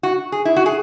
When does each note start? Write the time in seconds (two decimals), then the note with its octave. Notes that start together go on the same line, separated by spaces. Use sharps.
0.03 F#4
0.32 G#4
0.45 E4
0.56 F#4
0.66 G#4